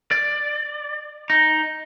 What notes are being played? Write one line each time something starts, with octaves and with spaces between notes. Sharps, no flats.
D5
D#4